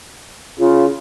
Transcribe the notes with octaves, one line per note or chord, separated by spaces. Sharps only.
C#3 F4